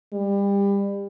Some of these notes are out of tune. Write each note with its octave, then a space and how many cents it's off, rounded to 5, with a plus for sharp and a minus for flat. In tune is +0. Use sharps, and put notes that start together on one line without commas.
G3 +30